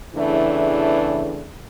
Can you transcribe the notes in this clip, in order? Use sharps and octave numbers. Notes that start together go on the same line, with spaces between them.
E2 A2 C#3 E3 A3 D4